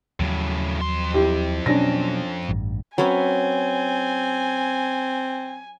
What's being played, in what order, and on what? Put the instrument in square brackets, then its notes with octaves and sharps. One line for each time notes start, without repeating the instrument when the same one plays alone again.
[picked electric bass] D#2 F3 F#3 [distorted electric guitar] A2 C#3
[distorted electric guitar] F2 C6
[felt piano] E4 G4
[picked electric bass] B2 F#3 [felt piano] C#4 D4 A#6
[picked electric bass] A1 G2
[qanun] F#3 C#4 B4 [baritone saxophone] C4 [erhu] G#5